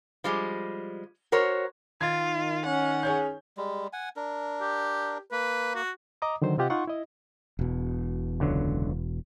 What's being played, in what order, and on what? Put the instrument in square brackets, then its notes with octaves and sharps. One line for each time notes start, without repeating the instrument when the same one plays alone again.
[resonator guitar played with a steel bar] F3 G3 G#3
F#4 A#4 C5 C#5
[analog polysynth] D#3 [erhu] F4 [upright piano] G#6 A6
[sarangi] C#4 [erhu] F#5
[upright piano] G#4 C#5 G6
[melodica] G3 G#3
F#5 G#5
D4 A#4
[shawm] G4
[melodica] A#3 [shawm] B4
[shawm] F#4
[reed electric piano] D#5 A#5 D6 D#6
D3 D#3 F#3 C5
C3 C4 F4 G4 D#5 F#5
D#4 F4 F#5 C6 C#6
E4 D#5
[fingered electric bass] E1 B2
[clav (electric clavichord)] C#2 D3 F#3